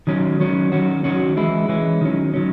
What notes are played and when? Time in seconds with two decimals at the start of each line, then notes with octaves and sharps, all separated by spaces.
0.07 D#3 F#3 C#4
0.40 D#3 F#3 C#4
0.72 D#3 F#3 C#4 F#4
1.04 D#3 F#3 C#4 F#4
1.37 E3 G#3 C#4 E4
1.68 E3 G#3 C#4 E4
2.01 D#3 F#3 C#4
2.34 D#3 F#3 C#4